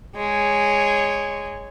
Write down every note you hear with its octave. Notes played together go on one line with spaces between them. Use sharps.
G#3 C#5